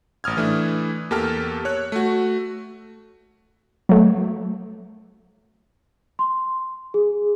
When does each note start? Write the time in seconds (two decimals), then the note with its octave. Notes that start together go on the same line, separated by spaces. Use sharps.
0.24 A1 D#6 F6 G#6
0.37 E3 A3 D4 E4
1.11 E2 A#3 G4 A4 A5 F6
1.65 C#5 F#6
1.92 A3 F#4
3.89 F#3 A3
6.19 C6
6.94 G#4